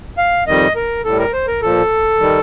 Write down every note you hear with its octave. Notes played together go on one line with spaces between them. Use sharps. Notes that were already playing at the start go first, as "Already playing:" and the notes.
F5
F2 D#3 G3 D#5
A#4
A2 G3 A4
A#4
C5
A#4
A#2 F3 A4
D#3 G3